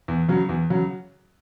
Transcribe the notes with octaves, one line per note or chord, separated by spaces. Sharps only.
E2
C#3 F#3
E2
C#3 F#3